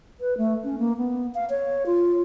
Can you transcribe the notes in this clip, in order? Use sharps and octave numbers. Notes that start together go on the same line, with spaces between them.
B4
A3
C#4
A#3
B3
F5
C#5
F4